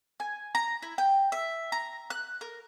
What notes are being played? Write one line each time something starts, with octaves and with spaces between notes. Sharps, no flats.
G#5
A#5
E4
G5
E5
A#5
F#6
A#4